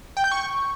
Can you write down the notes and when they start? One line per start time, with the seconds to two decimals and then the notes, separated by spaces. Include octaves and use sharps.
0.17 G5
0.24 G6
0.32 C#6